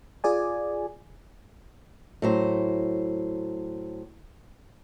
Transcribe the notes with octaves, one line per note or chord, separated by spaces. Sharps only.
F4 G#4 D5 G#5
A2 F#3 C5